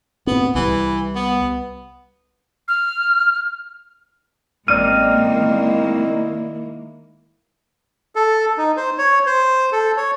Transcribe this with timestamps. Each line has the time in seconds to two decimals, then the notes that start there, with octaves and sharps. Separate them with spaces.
0.27 A2 B3 C4
0.55 C2 E3 G3
1.16 B3
2.68 F6
4.68 A1 G#3 A#3 C4 D#4 D5 F6 D#7
5.25 D#3 E4
8.16 A4
8.58 D#4
8.77 C5
8.98 C#5
9.26 C5
9.73 A4
9.97 C#5